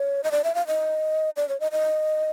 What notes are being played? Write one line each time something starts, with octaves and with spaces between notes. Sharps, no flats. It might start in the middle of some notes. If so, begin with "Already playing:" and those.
Already playing: C#5
D#5
D5
E5
F5
D#5
D5
C#5
D#5
D#5